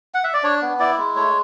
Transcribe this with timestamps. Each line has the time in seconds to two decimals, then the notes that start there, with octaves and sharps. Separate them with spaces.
0.14 F#5
0.24 E5
0.34 D5
0.43 D4 C#5
0.62 B3
0.80 E4 D5
0.98 G#3
1.16 A3 C#5